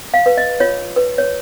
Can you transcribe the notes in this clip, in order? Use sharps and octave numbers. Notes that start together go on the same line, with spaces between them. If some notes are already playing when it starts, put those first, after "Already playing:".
F5
B4
D#5
F4 C#5
B4
C#5